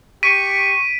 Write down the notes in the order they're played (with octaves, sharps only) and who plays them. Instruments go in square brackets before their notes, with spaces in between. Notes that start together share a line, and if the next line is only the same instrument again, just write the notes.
[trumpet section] G4 C#6 [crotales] B6 D7 D#7